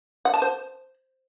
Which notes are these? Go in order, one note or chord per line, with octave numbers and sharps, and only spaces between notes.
F#5
A5
C5